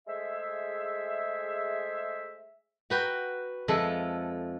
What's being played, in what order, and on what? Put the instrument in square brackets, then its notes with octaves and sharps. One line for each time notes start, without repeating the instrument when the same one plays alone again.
[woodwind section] G#3 A3 G#4 C5 E5
[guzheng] F#4 B4 G5 A#5
F2 F3 G#3 A4 E5 C6